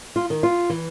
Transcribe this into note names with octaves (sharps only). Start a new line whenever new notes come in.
F4
D#3
F4
E3